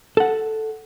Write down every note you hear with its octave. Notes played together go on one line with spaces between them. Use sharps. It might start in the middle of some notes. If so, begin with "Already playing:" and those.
A4 F#5